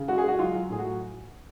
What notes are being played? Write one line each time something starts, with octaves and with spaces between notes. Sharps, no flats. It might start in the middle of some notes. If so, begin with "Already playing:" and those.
Already playing: C#3
G#3 F#4
G#4
G#3 F#4
F#3 F4
F#3
A2 G#4
F#4